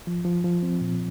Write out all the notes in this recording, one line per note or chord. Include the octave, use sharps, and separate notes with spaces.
F3
F3
F3
C4
A#2